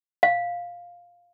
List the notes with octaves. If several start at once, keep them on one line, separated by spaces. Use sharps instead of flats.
F5